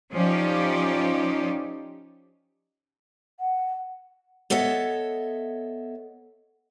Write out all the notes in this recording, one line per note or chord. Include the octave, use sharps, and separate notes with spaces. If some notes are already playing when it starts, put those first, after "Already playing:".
F3 C#4 D#4 G4 D5
F#5
B3 A4 C#5 D#5 E5